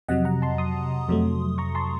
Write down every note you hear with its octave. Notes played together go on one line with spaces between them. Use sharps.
F2 C3 F#3 D#5 F#5
F#5 A#5
A5 C6
C6 D#6
F2 C3 F#3 A3
A#5 C#6
A5 C6